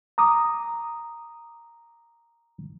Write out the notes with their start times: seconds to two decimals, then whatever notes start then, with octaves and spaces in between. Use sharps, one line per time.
0.18 A#5 D6 D#6